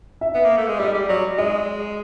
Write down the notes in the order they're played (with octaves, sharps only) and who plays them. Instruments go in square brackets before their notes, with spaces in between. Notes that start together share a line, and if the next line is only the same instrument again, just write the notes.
[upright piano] E5
[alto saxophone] B3
A#3
A3
G#3
[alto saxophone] G3 [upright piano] D#5
[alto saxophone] G3
[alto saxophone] F#3 [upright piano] D5
[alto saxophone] G#3 [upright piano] D#5